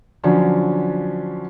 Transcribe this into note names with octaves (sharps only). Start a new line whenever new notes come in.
D3 F3 F#3 C#4 D4